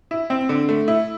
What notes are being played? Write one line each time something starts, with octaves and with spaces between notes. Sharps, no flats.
E4
C4
D3
A3
E4